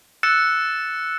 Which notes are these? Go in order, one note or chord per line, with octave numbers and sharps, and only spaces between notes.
E6 F#6 A6 C#7 E7